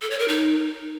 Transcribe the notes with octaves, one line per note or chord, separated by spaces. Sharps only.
A4
C#5
A#4
D#4